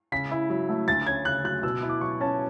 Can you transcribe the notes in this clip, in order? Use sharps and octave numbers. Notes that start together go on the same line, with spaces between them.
C#3 B6
E4
F#3
A3
D2 A6
C#4 G#6
C#3 F#6
F#3 F#6
B2 E6
E4
D6
F#3 C#6
C#4 A5